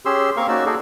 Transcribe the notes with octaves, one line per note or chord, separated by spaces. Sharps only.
C#4 G4 G#4 C6 E6
A#3 C4 A#4 F5 C#6
A#3 C#4 D#4 F#4 D5 E6
D#4 F#4 G#4 A4 D5